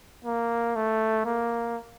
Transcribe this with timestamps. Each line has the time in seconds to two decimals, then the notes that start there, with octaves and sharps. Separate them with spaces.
0.24 A#3
0.75 A3
1.25 A#3